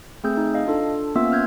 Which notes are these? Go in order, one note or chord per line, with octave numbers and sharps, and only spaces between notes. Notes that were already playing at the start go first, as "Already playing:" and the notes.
A3 C4 G#4 E6 G6
D#4
D#5 F5
D4 F4 A4
A#3 B3 C#4 F4 E5 E6
C#4 F6 G6 G#6